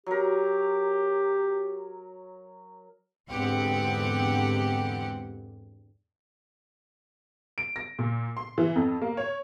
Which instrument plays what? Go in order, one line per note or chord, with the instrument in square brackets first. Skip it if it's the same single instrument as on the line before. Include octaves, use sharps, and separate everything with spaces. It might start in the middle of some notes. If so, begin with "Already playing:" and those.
[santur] F#3 A#4 [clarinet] G4
[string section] E2 G#2 D3 C4 G4 F#5
[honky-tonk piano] D7
A#6
A#2
C6
E3
F2
A#3
C#5